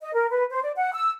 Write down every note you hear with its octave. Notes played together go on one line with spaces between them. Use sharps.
D#5
A#4
B4
C5
D5
F#5
E6